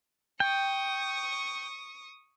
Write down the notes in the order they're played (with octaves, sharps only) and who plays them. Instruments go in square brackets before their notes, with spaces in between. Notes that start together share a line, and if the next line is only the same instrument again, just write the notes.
[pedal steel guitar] G5 [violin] C#6 D#6